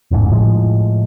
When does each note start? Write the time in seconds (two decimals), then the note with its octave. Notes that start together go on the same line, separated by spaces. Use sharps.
0.11 E1 A1 G#2
0.31 A2 F3 G#3